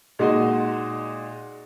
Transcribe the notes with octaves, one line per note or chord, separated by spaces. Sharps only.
A#2 G#3 D#4 F#4 D#5